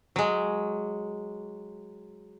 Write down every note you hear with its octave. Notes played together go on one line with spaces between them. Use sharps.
F#3 G#3